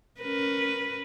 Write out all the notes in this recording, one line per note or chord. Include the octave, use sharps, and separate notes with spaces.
C#4 A#4 B4